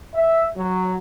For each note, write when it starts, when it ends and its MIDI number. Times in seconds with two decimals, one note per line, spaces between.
0.15 0.48 76
0.57 0.96 54